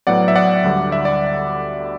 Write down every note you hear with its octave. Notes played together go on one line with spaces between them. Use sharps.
A2 F#3 B3 D5 F#5
E5
D5 F#5
D2 D3 G3
E5
D5